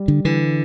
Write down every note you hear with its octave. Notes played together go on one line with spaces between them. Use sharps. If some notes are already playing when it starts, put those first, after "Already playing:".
Already playing: G3
D3
D3 E3